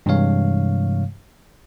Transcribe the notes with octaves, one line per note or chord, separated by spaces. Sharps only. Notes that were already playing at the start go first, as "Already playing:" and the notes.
G2 C3 E3 G#3 C#5 F5